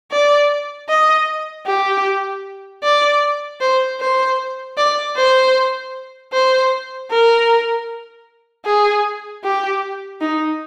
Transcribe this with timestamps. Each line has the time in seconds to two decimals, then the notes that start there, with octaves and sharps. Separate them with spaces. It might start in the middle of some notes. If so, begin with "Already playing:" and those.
0.11 D5
0.89 D#5
1.67 G4
2.83 D5
3.61 C5
4.00 C5
4.77 D5
5.16 C5
6.33 C5
7.11 A#4
8.66 G#4
9.44 G4
10.21 D#4